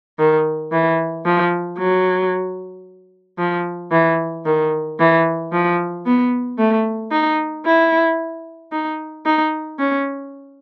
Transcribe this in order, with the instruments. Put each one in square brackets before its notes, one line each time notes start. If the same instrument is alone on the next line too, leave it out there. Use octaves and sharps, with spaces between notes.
[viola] D#3
E3
F3
F#3
F3
E3
D#3
E3
F3
B3
A3
D#4
E4
D#4
D#4
C#4